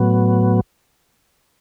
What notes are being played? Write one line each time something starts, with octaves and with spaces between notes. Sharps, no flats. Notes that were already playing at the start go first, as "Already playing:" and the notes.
Already playing: A2 F#3 B3